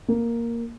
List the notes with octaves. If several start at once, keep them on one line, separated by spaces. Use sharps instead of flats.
A#3